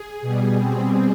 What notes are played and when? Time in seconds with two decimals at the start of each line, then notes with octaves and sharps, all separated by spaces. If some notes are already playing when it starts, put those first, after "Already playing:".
Already playing: G#4
0.22 B2 G3
0.60 C4